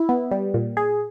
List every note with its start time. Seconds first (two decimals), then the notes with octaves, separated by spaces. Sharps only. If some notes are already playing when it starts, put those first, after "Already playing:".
Already playing: E4
0.09 B3
0.31 G3
0.54 A#2
0.77 G#4